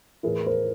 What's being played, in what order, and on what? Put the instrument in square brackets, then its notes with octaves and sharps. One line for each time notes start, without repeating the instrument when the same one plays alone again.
[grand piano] A2 E3 G#4 A#4
A#4 C5